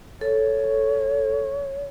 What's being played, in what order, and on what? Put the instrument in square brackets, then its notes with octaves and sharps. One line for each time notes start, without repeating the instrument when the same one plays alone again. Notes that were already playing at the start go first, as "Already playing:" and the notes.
[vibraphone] A4 [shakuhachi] C#5